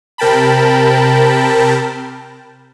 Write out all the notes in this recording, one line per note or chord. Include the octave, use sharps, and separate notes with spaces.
C3 A#4 G5 A5 B5